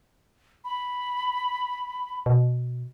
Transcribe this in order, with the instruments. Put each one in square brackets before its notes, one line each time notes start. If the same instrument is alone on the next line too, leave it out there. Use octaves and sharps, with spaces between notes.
[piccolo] B5
[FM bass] B2